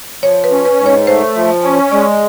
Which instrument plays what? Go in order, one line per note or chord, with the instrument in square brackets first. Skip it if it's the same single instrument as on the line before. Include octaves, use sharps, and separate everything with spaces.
[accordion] F3 [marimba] C#5
[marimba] B4
[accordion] C#4
[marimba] B4
[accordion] G#2
[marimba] C#5
[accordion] A3 [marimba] C5
[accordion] F3
C#4
[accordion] G#3 [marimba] D5